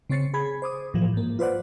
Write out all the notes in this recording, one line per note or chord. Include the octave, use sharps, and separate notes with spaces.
C#3 C4 C#5 A6 C7 C#7
G#4 B5 G#6
C5 D6 D#6
A2 E3 F3
G#2 A#3
F4 B4 C5 D5 F#5